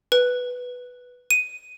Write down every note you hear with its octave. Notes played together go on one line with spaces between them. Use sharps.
B4
D#7